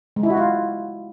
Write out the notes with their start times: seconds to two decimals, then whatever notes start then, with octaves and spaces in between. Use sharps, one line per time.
0.16 G#3
0.23 E4
0.30 F#4
0.37 F4